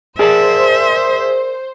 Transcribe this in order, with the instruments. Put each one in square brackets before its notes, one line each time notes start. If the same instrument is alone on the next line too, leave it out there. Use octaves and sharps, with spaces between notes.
[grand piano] G#4 [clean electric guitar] A#4 D5 A5 [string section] C5 [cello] E5